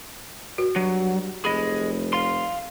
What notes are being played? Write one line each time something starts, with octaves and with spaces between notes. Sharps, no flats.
F#4
G2 F#3
F1 G#4 D#5 B5
F5 C6